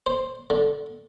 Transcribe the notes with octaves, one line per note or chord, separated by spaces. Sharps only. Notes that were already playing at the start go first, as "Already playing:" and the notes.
C5
D3